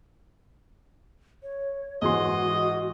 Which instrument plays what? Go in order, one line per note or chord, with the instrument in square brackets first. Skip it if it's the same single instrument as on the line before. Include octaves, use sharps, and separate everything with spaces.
[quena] C#5
[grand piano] G#2 E3 C6 [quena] F#4 [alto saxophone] D#5